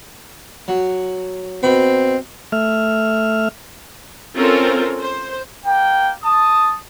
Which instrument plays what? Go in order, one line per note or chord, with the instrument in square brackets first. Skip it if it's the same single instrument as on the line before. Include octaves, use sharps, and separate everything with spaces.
[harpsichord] F#3
[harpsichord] B2 B5 [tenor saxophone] C4
[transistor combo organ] A3 E5 F6
[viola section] C4 C#4 F4 A4 A#4
C5
[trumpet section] A#3 G5
A5 D#6